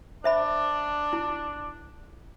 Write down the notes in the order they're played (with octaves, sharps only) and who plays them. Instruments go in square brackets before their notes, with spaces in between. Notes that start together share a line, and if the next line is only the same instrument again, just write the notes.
[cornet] D4 [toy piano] C5 E5 B5
[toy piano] E4